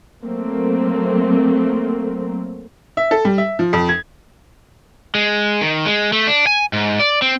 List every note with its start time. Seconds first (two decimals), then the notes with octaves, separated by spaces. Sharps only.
0.22 F#3 A3 A#3 C4
2.97 E5
3.11 A4
3.25 G3
3.38 E5
3.59 F3
3.73 F2
3.89 G#6
5.15 G#3
5.61 D#3
5.86 G#3
6.13 A3
6.27 D4
6.47 G#5
6.73 G#2
6.99 D5
7.22 C4